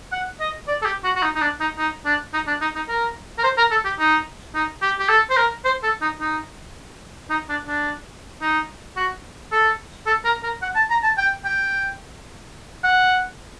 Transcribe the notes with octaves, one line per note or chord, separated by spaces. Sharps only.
F#5
D#5
D5
A4
G4
F#4
F#4
D#4
D#4
D4
D#4
D#4
D4
D#4
D4
D#4
D#4
A#4
A#4
C5
A#4
A4
G4
D#4
D#4
G4
G4
A4
C5
A#4
C5
A4
D#4
D#4
D#4
D4
D4
D#4
F#4
A4
A4
A#4
A#4
F#5
A5
A#5
A5
G5
G5
F#5